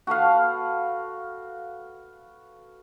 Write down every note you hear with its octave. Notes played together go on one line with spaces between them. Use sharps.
F#4 A4 B4 F5